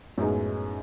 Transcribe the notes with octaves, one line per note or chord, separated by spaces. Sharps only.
F#2 A2 G#3 B3 D#4